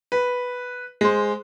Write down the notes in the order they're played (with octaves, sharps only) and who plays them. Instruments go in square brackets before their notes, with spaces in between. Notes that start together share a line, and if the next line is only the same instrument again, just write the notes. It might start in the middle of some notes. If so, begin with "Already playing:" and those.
[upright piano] B4
G#3 C5